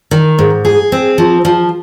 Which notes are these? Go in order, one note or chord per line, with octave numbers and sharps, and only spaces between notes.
D#3
G#2
G#4
C4
F3
F3